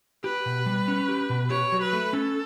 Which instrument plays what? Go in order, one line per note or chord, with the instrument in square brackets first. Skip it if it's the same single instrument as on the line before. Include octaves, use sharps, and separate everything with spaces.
[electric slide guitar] G4 [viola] B4
[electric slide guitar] B2
G3
C#4
G4
B2
[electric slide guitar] G4 [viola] C#5
[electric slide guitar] F#3
[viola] B4
[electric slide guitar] A3
[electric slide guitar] C#4 [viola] A4